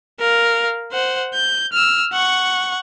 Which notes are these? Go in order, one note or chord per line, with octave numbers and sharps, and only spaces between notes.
A#4 F5
C5 F#5
G6
E6 F6
F#5 C#6